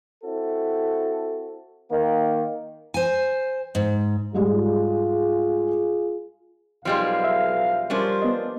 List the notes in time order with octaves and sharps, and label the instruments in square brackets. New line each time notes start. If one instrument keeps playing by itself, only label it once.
[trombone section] C4 E4 F#4 A4
D#3 A#3
[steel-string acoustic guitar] C5 G#5
G#2
[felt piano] G#2 G3 G#3 [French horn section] F4 G#4
[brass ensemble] B1 F5 [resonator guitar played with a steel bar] F3 G3 G#3
[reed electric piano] E5
[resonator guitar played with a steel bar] F3 C#4 D4 [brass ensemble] G3 A#4 C5
[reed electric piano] B3 D#5